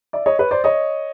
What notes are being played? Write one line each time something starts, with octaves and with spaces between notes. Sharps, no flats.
D5 E5
C#5 D#5
B4 C#5
C5 D5
C#5 D#5